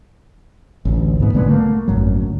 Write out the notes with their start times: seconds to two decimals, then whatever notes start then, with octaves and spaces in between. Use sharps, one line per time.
0.85 A1 D2
1.20 G#2 B3
1.33 B1 D3 G#3 B3
1.49 A3 A#3
1.88 G#1 F#2 F#3
2.20 D2